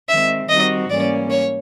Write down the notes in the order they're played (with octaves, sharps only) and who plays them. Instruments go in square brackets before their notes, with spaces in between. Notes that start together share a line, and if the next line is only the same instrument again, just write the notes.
[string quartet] D#3 G#3 C4 [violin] E5
[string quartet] D#3 G3 C4 D#4 F#4 [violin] D#5
[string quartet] G#2 E3 G3 A#3 C#4 [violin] D5
[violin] C#5